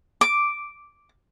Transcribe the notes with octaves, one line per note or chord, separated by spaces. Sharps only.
D6